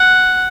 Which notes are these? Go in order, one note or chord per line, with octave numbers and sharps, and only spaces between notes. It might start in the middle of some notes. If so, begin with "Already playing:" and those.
Already playing: F#5